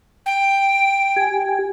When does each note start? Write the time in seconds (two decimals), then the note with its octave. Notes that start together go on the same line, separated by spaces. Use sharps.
0.26 G5
1.16 G4 G#5